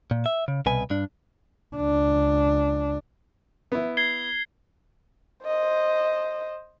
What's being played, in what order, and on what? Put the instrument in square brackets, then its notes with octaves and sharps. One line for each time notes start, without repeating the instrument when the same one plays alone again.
[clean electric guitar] A#2
E5
C#3
C2 B2 B4 G#5
G2 D4
[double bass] C#2 D4
[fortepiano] B3 E4
[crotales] G#6 C7 G7
[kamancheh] C5 D#5